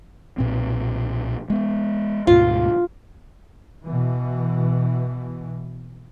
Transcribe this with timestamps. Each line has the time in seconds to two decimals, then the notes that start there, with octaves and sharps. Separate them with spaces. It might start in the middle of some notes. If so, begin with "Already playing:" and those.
0.38 B1 A#2 C4
1.50 G#3 B3
2.27 D2 G#2 B2 F4
3.84 B2 E3